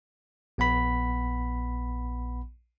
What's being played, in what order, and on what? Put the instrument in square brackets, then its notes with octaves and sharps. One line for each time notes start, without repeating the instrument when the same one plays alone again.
[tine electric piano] A#1 B3 F#5 B5 B6